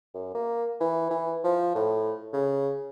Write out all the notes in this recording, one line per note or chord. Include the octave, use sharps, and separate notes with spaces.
F#2
A#3
E3
E3
F3
A2
C#3